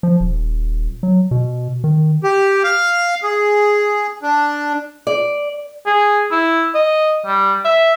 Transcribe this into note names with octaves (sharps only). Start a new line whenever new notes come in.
F3
D#1
F#3
B2
D#3
G4
F5
G#4
D4
D5
G#4
E4
D#5
G3
E5